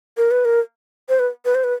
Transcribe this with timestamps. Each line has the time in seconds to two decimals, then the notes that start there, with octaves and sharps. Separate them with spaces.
0.17 A#4
0.31 B4
0.45 A#4
1.09 C5
1.19 B4
1.45 B4
1.55 C5
1.64 B4